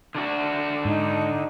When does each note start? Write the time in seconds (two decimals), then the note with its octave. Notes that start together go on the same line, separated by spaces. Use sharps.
0.15 D3 D4 F#4
0.85 G#2 D#4